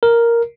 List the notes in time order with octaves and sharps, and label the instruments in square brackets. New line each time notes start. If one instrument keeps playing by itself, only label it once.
[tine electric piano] A#4